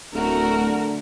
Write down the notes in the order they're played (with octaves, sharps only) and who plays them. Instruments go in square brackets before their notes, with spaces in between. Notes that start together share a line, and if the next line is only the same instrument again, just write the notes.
[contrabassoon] D1 [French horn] D3 [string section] A3 F#4 [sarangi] A#4